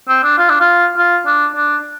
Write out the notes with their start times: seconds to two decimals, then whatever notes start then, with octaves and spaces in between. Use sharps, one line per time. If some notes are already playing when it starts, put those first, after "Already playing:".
0.09 C4
0.23 D4
0.38 F4
0.50 D4
0.61 F4
0.97 F4
1.26 D4
1.56 D4